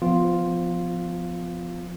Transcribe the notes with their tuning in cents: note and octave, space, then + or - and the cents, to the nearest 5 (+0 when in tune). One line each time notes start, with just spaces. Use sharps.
F3 +0 B3 +30 F4 +0